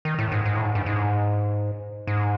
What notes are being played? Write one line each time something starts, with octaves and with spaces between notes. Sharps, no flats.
D#3
A2
G#2
G#2
A2
G#2
G2
G#2
G#2